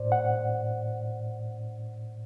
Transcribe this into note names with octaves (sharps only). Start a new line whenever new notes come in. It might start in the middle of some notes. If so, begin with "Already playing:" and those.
Already playing: A2 C5 D5
F#5